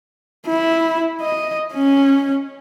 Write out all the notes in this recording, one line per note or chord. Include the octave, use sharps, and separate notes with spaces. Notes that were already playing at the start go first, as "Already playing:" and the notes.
E4
D#5
C#4